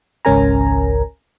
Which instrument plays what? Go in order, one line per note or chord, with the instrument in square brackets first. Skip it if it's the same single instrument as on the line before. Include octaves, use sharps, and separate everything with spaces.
[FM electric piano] G#1 C#2 C#4 A#4 G#5 A#5